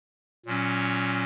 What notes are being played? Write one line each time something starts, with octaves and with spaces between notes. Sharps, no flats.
A#2 F#3 C#4